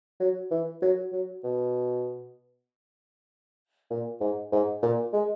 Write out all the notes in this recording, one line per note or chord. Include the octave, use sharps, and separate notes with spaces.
F#3
E3
F#3
F#3
B2
A#2
G#2
G#2
A#2
G#3